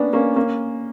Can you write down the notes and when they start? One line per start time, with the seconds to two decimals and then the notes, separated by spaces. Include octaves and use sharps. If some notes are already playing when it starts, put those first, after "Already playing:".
Already playing: A#3 B3 C#4 D4
0.13 A#3 C#4
0.36 A#3 C#4